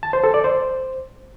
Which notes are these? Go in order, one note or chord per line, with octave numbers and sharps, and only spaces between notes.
A5
C5
A4
D5
C5